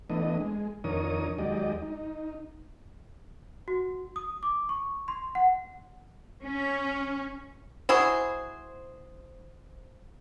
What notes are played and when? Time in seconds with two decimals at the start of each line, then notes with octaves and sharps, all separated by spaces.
0.10 E3 A3 B3 D4 D#5
0.41 G#3
0.84 F2 D#3 D4 A#4 C#5 D#6
1.38 D#2 F#3 G#3 G4 D5 D#5
1.82 D#4
3.68 F#4
4.16 D#6
4.43 D6
4.69 C#6
5.08 C6
5.35 F#5
6.43 C#4
7.89 E4 F#4 G#4 C5